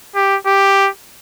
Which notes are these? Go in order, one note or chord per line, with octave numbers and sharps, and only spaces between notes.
G4
G4